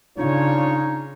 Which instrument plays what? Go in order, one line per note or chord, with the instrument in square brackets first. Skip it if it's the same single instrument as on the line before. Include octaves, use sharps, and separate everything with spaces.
[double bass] C#3 [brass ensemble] D4 F4 C#5 [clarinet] D#4